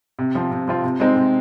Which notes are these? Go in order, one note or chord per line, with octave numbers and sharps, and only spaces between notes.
C3
F3 C4 F4
C3
F3 C4 F4
C3
G#3 C4 D#4
C3